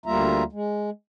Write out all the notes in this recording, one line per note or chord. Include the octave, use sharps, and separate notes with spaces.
D2 G3 A#3 F4 E5 A#5
G#3